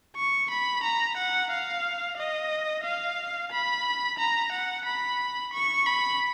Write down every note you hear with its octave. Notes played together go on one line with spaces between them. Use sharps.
C#6
B5
A#5
F#5
F5
D#5
F5
B5
A#5
F#5
B5
C#6
B5